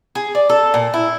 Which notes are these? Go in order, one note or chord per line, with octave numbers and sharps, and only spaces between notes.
G#4
D5
A4
A#2
E4